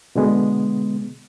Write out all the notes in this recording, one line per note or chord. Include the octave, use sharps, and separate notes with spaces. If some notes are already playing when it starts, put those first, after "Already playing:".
B2 D3 G#3 B3